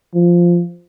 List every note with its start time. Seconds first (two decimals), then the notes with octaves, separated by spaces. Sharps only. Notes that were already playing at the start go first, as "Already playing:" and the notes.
0.15 F3